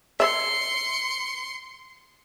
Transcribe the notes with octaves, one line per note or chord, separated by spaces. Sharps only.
C#5 D5 E5 C6 C#7